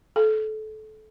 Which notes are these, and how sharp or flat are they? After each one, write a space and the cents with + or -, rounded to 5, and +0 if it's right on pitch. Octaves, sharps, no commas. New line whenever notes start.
A4 -25